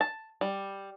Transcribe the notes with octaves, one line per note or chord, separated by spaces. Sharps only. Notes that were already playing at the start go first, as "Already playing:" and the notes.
A5
G3